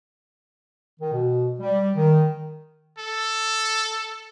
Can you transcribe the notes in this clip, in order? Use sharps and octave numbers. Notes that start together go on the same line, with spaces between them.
D#3
B2
G3
D#3
A4